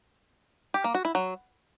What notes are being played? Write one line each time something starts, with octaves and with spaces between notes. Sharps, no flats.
G4
A#3
F#4
E4
F#3